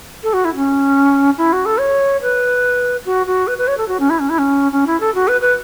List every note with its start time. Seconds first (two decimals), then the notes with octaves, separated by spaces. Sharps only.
0.23 A4
0.33 F#4
0.44 E4
0.55 C#4
1.38 E4
1.52 F#4
1.65 A4
1.79 C#5
2.21 B4
3.05 F#4
3.26 F#4
3.47 B4
3.58 B4
3.67 C#5
3.77 A4
3.88 F#4
3.99 C#4
4.09 E4
4.19 C#4
4.29 E4
4.38 C#4
4.72 C#4
4.86 E4
5.00 A4
5.14 F#4
5.28 B4
5.41 B4